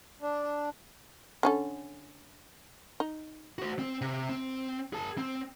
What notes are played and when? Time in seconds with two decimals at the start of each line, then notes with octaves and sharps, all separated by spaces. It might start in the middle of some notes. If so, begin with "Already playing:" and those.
0.22 D4
1.43 D3 C#4 A4
3.00 D#4
3.59 F#4 C5
3.79 C4
4.01 C3
4.29 C4
4.93 G#4 A5
5.18 C4